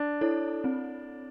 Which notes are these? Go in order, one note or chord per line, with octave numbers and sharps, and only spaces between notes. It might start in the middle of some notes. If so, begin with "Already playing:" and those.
Already playing: D4
E4 A4 C#5
C4